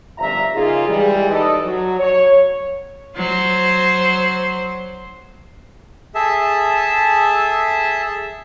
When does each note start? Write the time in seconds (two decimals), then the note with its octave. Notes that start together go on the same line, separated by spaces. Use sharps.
0.18 G1 F#2 F3 E5 F5 A#5
0.55 C#3 A#3 D#4 F4 G#4
0.88 E3 G3 G#3
1.31 D#4 A4 B4 D5 D#5
1.65 F#3
2.00 C#5
3.16 F#3 C5
6.15 G#4 A4 E5 A5